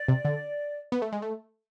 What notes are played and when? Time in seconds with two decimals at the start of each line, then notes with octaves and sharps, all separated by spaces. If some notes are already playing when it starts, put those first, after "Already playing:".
Already playing: D5
0.08 C3
0.25 D3
0.92 B3
1.02 A3
1.12 G#3
1.22 A3